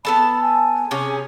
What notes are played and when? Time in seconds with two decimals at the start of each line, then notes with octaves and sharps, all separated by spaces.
0.05 B3 A4 A5 B5
0.42 G#5
0.91 C3 C#4 G#4